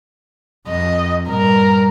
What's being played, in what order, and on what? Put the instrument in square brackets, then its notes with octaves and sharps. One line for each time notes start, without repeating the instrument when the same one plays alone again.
[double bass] F2 [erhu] D#5
[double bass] G2 A#2 [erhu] A#4